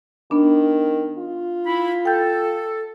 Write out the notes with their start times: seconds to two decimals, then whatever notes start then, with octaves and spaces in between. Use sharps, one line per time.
0.31 D#3 B3 D4
1.18 F4
1.66 E4 B5
2.05 A4 G5 G6